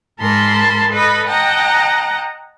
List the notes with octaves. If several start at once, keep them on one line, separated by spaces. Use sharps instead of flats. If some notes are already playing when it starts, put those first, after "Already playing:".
G#2 A#4 A5 B5 C6
A4 B4 D#5 B5
D#5 F#5 G5 A5 A#5